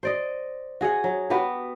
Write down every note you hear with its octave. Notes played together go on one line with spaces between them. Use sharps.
C5 D5 D#5
F#4 G#4 D#5 F#5
F#3
B3 F#4 G4 B4